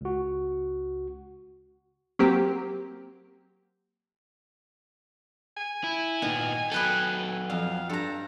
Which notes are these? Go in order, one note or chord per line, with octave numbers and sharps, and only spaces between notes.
C#2 F#4
F#3 A#3 C4 G4
G#5
E4
A#2 D#3 B3
F#3 B3 A4 B4 G5
F2 F5
G2 A4 A#5